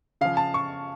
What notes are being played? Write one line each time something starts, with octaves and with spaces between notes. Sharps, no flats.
C#3 F3 F5
A5
C#6